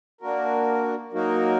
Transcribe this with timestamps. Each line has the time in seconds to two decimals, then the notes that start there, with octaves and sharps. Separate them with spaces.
0.21 A#3 D4 F#4 A#4
1.13 F#3 A#3 D#4 F#4 A#4